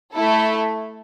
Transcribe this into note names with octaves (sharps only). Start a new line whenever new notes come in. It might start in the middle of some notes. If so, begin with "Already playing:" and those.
A3 E4 A4